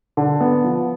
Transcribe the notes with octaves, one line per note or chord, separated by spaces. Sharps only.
D3
B3
F3